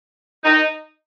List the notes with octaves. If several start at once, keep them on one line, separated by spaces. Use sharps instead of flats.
D#4